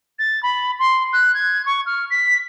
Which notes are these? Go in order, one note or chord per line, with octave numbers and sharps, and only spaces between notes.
A6
B5
C6
F#6
G#6
C#6
F6
B6